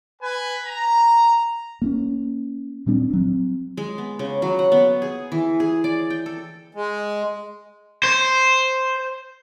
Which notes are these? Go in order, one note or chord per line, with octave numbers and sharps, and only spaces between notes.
B4 G#5
A#5
A#3 C4 C#4
A#2 G3 C4 D4
F#3 C4
G#3
B3
C#3
F#3
F#5
B3
G#4
E3
G#4
D5
G5
A4
G#3
C5